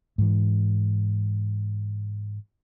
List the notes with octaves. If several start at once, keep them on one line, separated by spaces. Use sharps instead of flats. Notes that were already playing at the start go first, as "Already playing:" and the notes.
G#2 E3